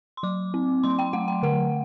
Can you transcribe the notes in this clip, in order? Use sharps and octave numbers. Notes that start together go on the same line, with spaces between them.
C6
F#3 D6
C4
F#3 C6
G5
A3 F#5
G5
D3 F#5